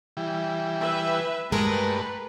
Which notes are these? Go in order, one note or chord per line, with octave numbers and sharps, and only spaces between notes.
E3 G3
B4 E5
G2 G#3 A3 A#4 B4